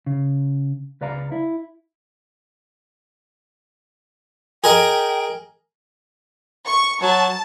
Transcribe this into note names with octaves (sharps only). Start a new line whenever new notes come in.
C#3
C#2 B4 D5 F5 A#5
E4
G#4 A#4 D#5 G5
C#6
F#3 A5